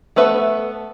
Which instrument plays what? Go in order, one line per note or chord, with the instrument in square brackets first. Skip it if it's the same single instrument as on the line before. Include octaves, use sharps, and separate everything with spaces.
[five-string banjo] A3 B3 B4 E5